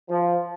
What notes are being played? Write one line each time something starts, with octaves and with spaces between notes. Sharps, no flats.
F3